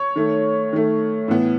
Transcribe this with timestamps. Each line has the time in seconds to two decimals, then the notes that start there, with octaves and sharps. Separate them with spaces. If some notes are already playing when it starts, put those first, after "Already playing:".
Already playing: C#5
0.16 D#3 A3
0.73 D#3 A3
1.28 A2 E3 B3